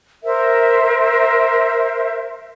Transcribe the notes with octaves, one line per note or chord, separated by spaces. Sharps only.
A#4 C5 E5